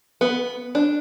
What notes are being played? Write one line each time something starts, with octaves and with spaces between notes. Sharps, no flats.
B3
D4